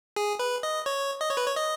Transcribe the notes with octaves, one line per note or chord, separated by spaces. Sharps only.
G#4
B4
D#5
C#5
D#5
C#5
B4
C#5
D#5